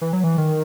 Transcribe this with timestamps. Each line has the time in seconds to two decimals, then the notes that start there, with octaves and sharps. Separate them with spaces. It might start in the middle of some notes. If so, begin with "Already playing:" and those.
0.01 E3
0.13 F#3
0.24 E3
0.38 D#3